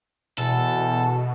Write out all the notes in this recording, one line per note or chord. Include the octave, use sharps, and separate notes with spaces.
E2 B2 A4